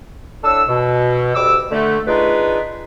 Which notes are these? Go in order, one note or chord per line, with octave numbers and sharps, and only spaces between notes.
A2 D4 A4 E6
B2
D2 G3 D6 E6
D3 A3
D4 D#4 F4 G#4 B4